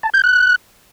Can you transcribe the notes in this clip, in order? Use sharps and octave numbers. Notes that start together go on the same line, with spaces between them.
A5
G6
F#6